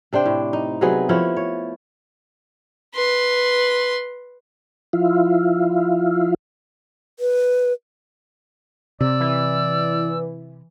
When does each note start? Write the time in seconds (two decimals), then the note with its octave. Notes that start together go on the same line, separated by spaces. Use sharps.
0.13 C3 D4 C5 G5
0.26 A2
0.53 D#4
0.81 C3 F#3 B3 G#4
1.09 F3 A3 E4 C#5
1.37 C#5
2.95 B4 C6
4.93 F3 E4 F4
7.19 B4
9.01 C3 D5 E6
9.20 E3